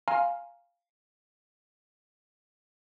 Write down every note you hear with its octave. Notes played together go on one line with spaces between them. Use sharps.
F5 G#5 A#5 C6 F6